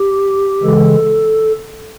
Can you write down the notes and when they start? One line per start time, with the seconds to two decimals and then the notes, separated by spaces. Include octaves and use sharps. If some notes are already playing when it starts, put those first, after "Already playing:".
Already playing: G4
0.63 C#3 E3 G#3 A4